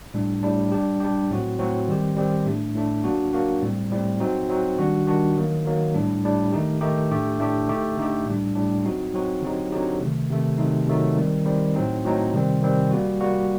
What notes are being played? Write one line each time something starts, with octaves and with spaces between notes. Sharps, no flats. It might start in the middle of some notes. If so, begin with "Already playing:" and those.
A2 G3 D4
A2 G3 D4
G3 D4 G4
G3 D4 G4
A2 F#3 C4 F#4
A2 F#3 C4 F#4
D#3 G3 C4 G4
D#3 G3 C4 G4
A2 A3 D4
A2 A3 D4
F#3 A#3 D4 F#4
F#3 A#3 D4 F#4
A2 G3 C4
A2 G3 C4
F#3 C4 D#4 F#4
F#3 C4 D#4 F#4
D#3 G3 D4 F#4
D#3 G3 D4 F#4
D#3 F#3 A#3
D#3 F#3 A#3
A2 G3 D4
A2 G3 D4
D#3 A3 D#4 G4
D#3 A3 D#4 G4
A2 A3 D4 G4
A2 A3 D4 G4
D3 A3 D#4 G4
D3 A3 D#4 G4
A2 G3 D4
A2 G3 D4
F#3 C4 D#4 F#4
F#3 C4 D#4 F#4
D3 F#3 C4 D#4 G4
D3 F#3 C4 D#4 G4
C3 D#3 A3
C3 D#3 A3
C3 D#3 F#3 A3 D#4
C3 D#3 F#3 A3 D#4
D#3 G3 C4
D#3 G3 C4
A2 F#3 C4 D#4
A2 F#3 C4 D#4
C3 D#3 G3 C4
C3 D#3 G3 C4
G3 A#3 F#4
G3 A#3 F#4